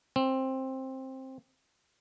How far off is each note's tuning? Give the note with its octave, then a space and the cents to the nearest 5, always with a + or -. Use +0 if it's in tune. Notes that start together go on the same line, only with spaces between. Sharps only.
C4 +15